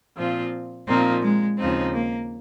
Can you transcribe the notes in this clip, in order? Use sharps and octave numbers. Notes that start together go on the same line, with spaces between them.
A#2 F3 C4 F4
A#2 F3 A#3 C4 D#4
G#3
D#2 C#3 F3 C4 D#4
A#3